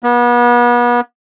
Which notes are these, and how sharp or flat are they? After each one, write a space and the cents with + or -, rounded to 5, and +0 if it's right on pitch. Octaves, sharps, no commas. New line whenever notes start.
B3 -35